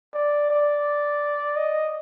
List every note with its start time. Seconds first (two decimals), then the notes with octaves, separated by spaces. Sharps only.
0.14 D5
0.50 D5
1.56 D#5